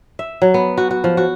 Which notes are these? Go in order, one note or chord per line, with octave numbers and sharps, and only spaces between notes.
E5
F#3
B3
F#4
F#4
F3
F#4